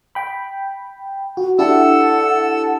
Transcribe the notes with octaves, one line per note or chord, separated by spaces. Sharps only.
G5 B5
F#4
D4 E4 G4 A4 F#5 E6